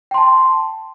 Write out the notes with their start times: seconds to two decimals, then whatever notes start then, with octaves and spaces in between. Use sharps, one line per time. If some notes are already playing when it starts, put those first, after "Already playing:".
0.11 G5
0.14 C6
0.18 A5